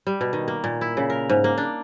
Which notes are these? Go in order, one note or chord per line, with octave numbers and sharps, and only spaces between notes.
G3
B2
D#3
A#3
A#2
E4
C#3
A#4
G#2
A#3
D4